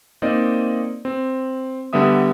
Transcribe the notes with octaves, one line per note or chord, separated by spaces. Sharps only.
A#3 C4 D#4 D5 D#5
C4
D3 G3 B3 E5 D#6